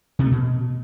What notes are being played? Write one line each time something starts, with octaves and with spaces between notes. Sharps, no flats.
C3
A3
B2